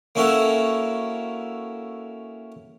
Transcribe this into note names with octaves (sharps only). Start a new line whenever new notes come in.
A#3 C#4 E4 F#4 A4